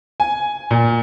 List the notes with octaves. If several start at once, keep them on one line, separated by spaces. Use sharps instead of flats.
G#5
A#2